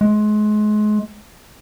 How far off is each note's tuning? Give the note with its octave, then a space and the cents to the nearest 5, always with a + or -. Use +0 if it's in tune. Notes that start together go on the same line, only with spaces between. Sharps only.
G#3 +30